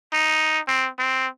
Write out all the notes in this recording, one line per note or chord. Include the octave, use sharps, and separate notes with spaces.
D#4
C4
C4